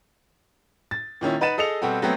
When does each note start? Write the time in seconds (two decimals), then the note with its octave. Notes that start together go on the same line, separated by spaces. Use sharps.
0.91 A6
1.21 A#2 D#3 C#4 E4
1.41 D#4 B4 F#5 A6 D#7 E7
1.58 G#4 A4 D#5 C#7 F7
1.82 B2 G3 C4 F#4 A4
2.02 F#3 G3 A3 B3 C4